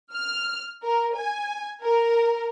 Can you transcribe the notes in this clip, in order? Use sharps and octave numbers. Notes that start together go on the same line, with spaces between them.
F6
A#4
G#5
A#4